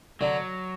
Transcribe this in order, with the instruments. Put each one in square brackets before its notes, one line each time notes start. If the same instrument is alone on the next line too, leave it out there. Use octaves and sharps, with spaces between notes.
[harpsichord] D3 [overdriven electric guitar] F#3